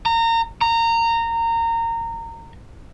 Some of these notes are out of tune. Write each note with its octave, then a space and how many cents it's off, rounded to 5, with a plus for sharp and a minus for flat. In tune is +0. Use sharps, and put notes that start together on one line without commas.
A#5 -30
A#5 -20